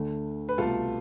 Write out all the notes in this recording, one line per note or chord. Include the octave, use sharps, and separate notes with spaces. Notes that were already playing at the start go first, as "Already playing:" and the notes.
Already playing: D2 D3 A3
B4
C2 B2 A3 F4 A4